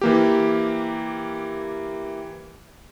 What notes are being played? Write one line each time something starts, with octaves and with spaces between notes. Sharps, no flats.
E3 A#3 G4